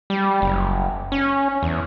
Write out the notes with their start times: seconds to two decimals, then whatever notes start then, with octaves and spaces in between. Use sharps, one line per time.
0.10 G3
0.42 F#1
1.12 C#4
1.63 E2